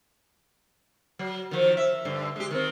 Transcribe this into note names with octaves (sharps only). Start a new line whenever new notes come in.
F#3
D#3 F3
E5
G2 D3
G#3 G4
D#3 C4